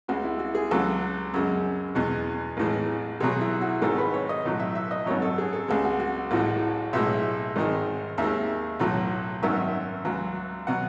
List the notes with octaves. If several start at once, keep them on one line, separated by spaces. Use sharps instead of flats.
C#2 C#3 G#3 F#4
E4
F#4
G#4
C#2 C#3 F#3 A4
F#2 C#3 G#3
E2 B2 G#3
A1 A2 E3 G#3
B1 B2 F#3 G#4
E4
F#4
G#1 G#2 D#3 G#3 A4
B4
C#5
D#5
B1 A2 F#3
E5
E5
D#5
G#1 F#2 C#3 F#3 C#5
A4
G#4
A4
C#2 C#3 G#3 G#4
F#4
F#4
A1 A2 E3 G#3 F#4
B1 A2 G#3 E5
G#1 G#2 D#3 G#3
D#2 D#3 G#3 E5
B1 A2 F#3
G#1 F#2 D#3 F#3 E5
C#2 C#3 F#3
B2 F#3 F#5